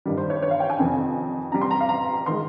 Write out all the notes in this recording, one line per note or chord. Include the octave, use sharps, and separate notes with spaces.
G2 D#3 G3
C5
C#5
C#5
F5
G5
G#5
F2 C3 D#3
C3 G3 A#5
C6
A#5
F5
A#5
D#3 G#3 C6